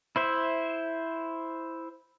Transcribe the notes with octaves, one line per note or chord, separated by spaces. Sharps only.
E4 C5 E5